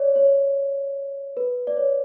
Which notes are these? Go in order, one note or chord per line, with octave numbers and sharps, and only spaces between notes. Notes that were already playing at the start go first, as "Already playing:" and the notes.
Already playing: C#5 D5
C#5
B4
D5
C#5